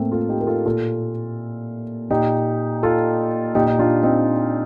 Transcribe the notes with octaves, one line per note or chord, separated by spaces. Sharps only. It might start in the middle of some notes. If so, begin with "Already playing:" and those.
Already playing: A2 A3 A#3 C4
F4 A4
D#4 G4
A#4
F4 A4
A#2 F4 A4
A#2 D#4 G4
F4 A4
A#2 D#4 G4
D#4
D4 F4
C4 D#4